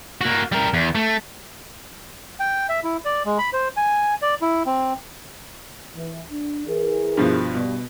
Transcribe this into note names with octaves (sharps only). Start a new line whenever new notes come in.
A#3 F#4
G3 A#4
E2
A3
G5
E5
E4
D5
G#3
B5
C5
G#5
D5
E4
C4
E3
D4
E3 G#4 A#4
G2 B2 F3
G2 B2